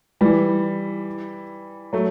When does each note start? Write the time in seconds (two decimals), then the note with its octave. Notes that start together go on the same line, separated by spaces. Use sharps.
0.21 E3 G3
1.93 F#3 A3